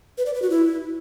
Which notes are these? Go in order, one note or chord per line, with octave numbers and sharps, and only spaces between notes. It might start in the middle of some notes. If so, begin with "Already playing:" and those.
B4
D5
B4
F#4
E4